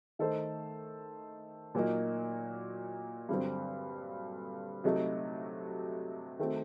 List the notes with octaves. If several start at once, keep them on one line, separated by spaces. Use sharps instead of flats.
D#3 A3 D#4 A4 C5
A#2 F#3 A#3 D#4
G2 D3 F#3 C4
C3 F#3 A3 D#4
D#3 A3 C4 F#4